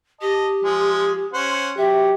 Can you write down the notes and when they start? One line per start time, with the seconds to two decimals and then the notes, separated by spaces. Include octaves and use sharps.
0.21 G4 D#5 A5
0.64 F3 G#3 G#4
1.33 C#4 C5 F#5
1.78 F#3 G4 E5